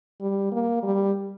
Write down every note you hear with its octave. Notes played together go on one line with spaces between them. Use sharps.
G3
A#3
G3